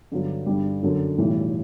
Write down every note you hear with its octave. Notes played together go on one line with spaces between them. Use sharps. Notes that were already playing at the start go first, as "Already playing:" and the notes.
G2 D3 F#3
G2 D3 G3
F#2 D3 F#3
B1 A2 E3 G3